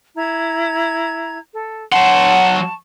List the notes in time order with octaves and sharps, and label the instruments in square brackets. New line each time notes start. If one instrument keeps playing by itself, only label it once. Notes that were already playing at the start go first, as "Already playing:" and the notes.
[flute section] E4 A#5 G#6
A4
[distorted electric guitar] F#3 C6 [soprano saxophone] F#5 [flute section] A5 C#6